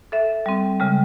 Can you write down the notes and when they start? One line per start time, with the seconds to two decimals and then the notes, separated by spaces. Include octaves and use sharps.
0.12 A4 E5
0.46 G3 C4
0.80 C#3 G3 G#3